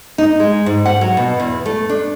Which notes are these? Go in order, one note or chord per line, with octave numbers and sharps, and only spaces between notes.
D#4
G#3
G#2
F#5
F#3
B2
E2
A3
D4